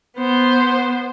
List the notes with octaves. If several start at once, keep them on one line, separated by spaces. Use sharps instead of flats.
B3 C5